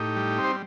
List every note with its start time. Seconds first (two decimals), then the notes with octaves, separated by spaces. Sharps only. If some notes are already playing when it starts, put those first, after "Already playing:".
Already playing: A2 D#4 G4
0.16 G3
0.38 C4
0.44 C5